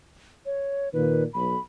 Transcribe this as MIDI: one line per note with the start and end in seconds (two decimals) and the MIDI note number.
0.46 0.89 73
0.93 1.23 46
0.93 1.23 51
0.93 1.24 71
1.33 1.54 35
1.33 1.59 83